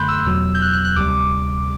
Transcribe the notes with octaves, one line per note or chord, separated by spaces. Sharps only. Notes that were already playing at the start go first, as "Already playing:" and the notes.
Already playing: F#2 D3 A3 B5 C6 F#6 G6
E6
E2 B2 F#3
G6
F#6
F#6
F#6
D2 C3 G3 D6